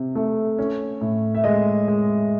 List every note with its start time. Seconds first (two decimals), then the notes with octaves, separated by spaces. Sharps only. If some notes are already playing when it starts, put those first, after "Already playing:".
Already playing: C3
0.15 A3
0.59 C#4
1.01 A2
1.35 E5
1.44 G#3 D#5
1.88 G#3